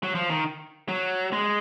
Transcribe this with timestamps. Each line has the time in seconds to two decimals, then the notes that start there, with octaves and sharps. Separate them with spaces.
0.03 F#3
0.15 F3
0.30 D#3
0.88 F#3
1.33 G#3